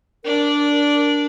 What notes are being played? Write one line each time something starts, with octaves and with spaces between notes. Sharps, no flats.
D4 A#4 D5